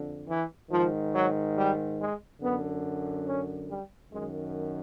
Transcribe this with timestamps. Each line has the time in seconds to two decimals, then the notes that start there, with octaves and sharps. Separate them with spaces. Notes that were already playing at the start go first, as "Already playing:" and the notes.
Already playing: F2 D3
0.28 E3
0.70 G#2 D#3 F3
1.13 F#3
1.56 G3
1.99 G#3
2.41 F#2 D3 B3
3.26 C#4
3.69 G3
4.12 F#2 D#3 G#3